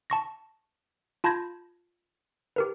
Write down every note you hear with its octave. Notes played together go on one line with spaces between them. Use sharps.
A5 C#6 A#6
F4 A5 B5 G6 G#6 A#6
G4 A#4 B4